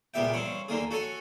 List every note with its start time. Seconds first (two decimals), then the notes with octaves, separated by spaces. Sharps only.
0.14 C#2 A#2 B3 G4 E5 G5
0.33 G2 C4 C#5 B5
0.68 D#2 D3 A#3 G#4
0.91 F#4 A4 C#5 G#5